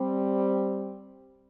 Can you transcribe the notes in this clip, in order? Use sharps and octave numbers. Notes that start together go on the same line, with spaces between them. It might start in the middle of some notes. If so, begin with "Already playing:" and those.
Already playing: G3 C4